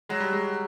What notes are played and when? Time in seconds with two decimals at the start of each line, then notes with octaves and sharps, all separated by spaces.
0.09 F#3 G#3
0.20 G3
0.33 G#3